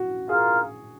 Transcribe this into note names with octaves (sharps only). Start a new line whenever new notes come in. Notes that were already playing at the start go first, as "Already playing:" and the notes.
Already playing: F#4
F4 G#4 A#4 F5